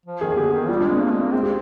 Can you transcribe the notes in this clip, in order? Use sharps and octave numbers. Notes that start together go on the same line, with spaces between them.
F3
D#3 G#4
G#4
D3 G4
D#3
G3 F4
D4
G#3
C4
A#3
G#3
A#3
G#3 C4
G4